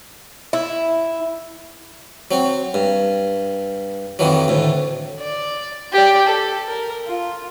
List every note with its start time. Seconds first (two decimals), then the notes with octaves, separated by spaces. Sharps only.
0.53 E4
2.31 F#3 C4
2.74 G2
4.19 F2 D#3 E3 F#3
4.48 D2 A2
5.19 D5
5.92 G4 D5
6.27 A4
6.68 A#4
7.06 F4